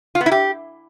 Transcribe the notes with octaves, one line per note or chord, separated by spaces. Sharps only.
F4
B3
E4
G4